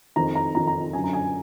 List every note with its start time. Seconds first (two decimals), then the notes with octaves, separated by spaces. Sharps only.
0.16 F2 D#3 A#5
0.35 A#5
0.55 F2 D#3 A#5
0.67 A#5
0.93 F#2 D3 G#5
1.04 A#5
1.13 G#5